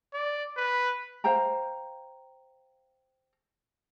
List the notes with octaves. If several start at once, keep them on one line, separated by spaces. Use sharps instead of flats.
D5
B4
C5 F5 G5 A#5